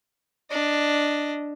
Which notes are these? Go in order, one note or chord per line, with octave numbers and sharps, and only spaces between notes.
D4 D#5